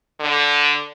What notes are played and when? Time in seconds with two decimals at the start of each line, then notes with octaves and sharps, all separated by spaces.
0.20 D3